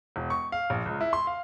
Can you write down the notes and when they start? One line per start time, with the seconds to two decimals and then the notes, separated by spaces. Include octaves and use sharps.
0.16 E1
0.30 C#6
0.52 F5
0.70 A#1
0.86 C#2
1.01 E4
1.13 C6
1.27 F5